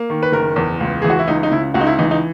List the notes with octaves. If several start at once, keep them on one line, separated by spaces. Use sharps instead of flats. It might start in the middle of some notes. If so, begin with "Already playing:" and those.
Already playing: A#3
D#3
B4
F#1 A#4
E2
C#2
E3 G#4
F#4
E4
C#2 D#4
D#4
C#3 E4
C#2 F#4
D#4
E4
E3 D#4
D#4